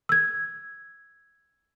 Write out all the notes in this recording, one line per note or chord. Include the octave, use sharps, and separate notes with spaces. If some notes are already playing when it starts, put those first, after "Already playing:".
E6 G#6